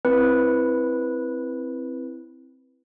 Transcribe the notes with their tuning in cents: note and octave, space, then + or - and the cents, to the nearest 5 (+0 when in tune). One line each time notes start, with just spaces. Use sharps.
C4 +0 E4 +0 B4 -15